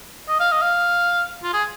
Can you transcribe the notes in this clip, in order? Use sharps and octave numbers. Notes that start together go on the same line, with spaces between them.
D#5
F5
D#5
F5
F4
G#4